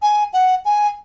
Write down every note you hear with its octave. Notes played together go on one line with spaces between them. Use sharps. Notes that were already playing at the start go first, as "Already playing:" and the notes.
G#5
F#5
G#5